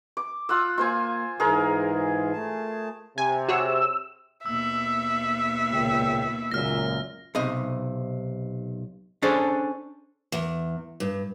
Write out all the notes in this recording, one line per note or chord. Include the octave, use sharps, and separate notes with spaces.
D6
F4 F#5 E6
A#3 F4 C5 G#5
G#2 E3 G#4 A#4 C5
A3 A5
C3 G#5
F#4 G#4 C#5 E6
D#2 B2 E5 E6
C#2 A#2 G5
C#2 F#2 A#2 F6 A#6
B1 C3 D#5
C#4 D4 G#4 A4 C5 D5
E2
G2